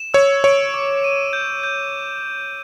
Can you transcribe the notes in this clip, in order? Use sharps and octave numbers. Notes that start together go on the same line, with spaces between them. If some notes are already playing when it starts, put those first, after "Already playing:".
Already playing: E7
C#5 E6
C#5 D7
D6
D#7
G6
G6